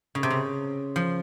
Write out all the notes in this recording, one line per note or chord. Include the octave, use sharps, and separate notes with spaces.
C#3
C3
C#3
F3